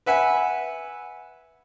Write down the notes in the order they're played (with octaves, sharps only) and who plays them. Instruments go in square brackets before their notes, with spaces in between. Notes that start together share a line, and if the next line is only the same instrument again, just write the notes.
[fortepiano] B4 E5 F#5 G#5